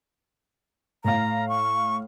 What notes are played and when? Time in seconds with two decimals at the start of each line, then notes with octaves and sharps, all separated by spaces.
1.04 A2 F5 A#5
1.49 C#6